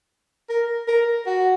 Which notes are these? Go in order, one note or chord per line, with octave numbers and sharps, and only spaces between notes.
A#4
A#4
F#4